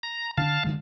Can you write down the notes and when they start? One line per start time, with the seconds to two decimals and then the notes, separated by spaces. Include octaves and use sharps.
0.03 A#5
0.38 D3 C#4 D4 F5 A5
0.64 D3 D#3 G#3